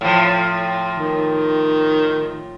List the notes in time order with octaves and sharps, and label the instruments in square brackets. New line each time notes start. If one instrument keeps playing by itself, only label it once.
[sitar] A2 F3
[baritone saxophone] D#3